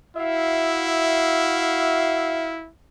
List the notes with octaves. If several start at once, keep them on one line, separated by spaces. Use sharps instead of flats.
E4 F#4 E5 F5